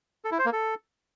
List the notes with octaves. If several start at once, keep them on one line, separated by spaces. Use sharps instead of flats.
A4
E4
C5
A#3
A4